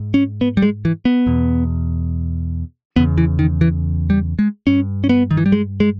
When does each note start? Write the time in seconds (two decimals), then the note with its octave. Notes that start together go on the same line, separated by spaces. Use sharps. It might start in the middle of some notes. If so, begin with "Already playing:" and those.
Already playing: G#2
0.14 C#4
0.41 B3
0.57 G3
0.62 G#3
0.85 E3
1.05 B3
1.27 E2 B2
2.96 E2 C#3 B3
3.18 E3
3.39 D#3
3.61 E3
4.10 G3
4.39 G#3
4.67 G2 C#4
5.04 C#4
5.09 B3
5.31 D#3
5.37 E3
5.46 G3
5.52 G#3
5.80 G#3